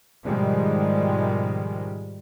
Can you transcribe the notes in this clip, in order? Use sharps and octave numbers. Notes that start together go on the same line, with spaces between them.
G#2 B2 D#3 F3 G3 G#3